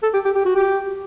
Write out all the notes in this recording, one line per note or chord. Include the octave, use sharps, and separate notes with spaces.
A4
G4
G4
G4
F#4
G4